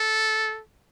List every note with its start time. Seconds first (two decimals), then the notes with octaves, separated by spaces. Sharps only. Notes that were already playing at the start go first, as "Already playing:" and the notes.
Already playing: A4